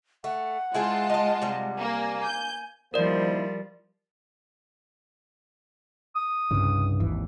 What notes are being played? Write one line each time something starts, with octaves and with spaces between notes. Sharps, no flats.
A3 F#5
G#3 E4 F4 G#4 C5 A5
D#4 D#5
C3 G3
A#3 G#5
G6
D#3 F3 G3 A#3 E4 A#4 C5 D5
D#6
C2 G2 C#3
G#1 D#2 E3